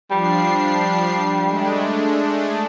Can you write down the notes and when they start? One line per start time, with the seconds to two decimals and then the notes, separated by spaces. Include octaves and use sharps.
0.11 F3 G3 D4 C7
1.45 G#3 A3 D4